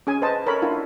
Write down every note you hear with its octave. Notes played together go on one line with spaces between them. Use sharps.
C#4 G#4 G#5
B4 C5 D#5 A5
A4 A#4 C#5 B5
D4 E4 F4